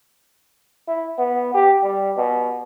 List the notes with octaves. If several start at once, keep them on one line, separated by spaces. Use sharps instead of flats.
E4
B3
G4
G3
B2